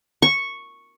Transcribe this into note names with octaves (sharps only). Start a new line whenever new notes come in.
C#6